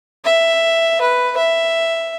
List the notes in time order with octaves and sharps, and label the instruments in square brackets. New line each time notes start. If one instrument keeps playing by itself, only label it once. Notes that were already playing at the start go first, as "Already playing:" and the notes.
[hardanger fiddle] E5
B4
E5